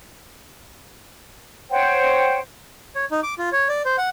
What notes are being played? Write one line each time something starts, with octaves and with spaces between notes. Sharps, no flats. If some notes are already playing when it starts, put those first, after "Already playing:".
C5 C#5 F#5 G5
C#5
D#4
D6
F4
C#5
D5
C5
F#5